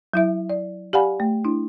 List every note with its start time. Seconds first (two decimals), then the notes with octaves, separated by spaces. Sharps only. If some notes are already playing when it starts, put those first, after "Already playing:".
0.14 F#3 E4 E5
0.50 D5
0.93 G4 D5 F5 F#5 G#5 B5
1.20 A3
1.44 D4 E4